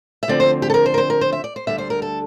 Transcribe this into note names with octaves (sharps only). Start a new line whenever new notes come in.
E5
D2 D3 F3 C4 D5
C5
G4
A4
A#4
C5
A#4
C5
A#4
C5
E5
D5
C5
D2 D3 G3 E5
C5
A#4
A4